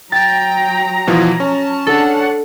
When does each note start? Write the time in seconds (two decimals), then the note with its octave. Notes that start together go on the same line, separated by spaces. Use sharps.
0.12 F#3 G5 A#5 A6
1.07 B2 E3 F3
1.40 C#4 A5
1.87 D4 A4 F#5